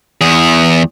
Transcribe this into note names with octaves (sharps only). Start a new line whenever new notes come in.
E2 G#4